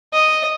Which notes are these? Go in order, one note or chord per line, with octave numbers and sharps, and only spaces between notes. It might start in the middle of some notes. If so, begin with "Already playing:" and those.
D#5